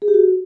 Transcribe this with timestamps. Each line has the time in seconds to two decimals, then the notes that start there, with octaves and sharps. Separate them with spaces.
0.02 G#4
0.08 G4
0.14 F#4